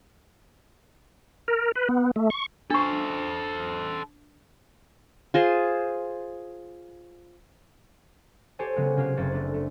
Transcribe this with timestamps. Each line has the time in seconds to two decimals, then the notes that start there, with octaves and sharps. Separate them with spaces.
1.48 A#4
1.76 B4
1.89 B3
2.16 A3
2.30 C#6
2.70 D4 A4 C5 C#6
5.34 F4 G#4 C5
8.59 G4 A4 C5 C#5 G#5 A5
8.76 C#3 F#3 G#3 B3
8.97 C3 C#4 F4 G4 G#4
9.17 F#1 C4 C#4 A6
9.32 A3 D4
9.54 A3